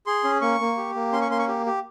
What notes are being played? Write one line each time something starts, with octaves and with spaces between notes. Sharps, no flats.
G#4 C6
C#4
A#3 C#6
A#3
G4
A#3
C#4 C6
C#6
A#3 C6
C#6
G4
G4